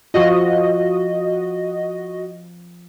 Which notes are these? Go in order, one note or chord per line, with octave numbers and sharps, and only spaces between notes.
F3 F4 F#4 D#5